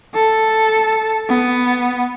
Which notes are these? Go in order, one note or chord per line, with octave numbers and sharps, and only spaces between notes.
A4
B3